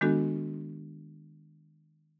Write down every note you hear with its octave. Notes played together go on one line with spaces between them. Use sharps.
D#3 G#3 B3 D4 F#4 A4